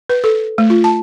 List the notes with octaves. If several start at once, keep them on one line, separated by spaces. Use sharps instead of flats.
B4
A4
A3
F4
A5